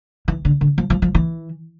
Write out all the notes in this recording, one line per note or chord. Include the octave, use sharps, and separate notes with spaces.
E3
D3
D3
F3
F3
F3
E3